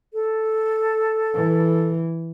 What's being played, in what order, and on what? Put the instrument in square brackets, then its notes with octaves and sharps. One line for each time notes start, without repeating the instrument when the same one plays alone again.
[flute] A4
[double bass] E3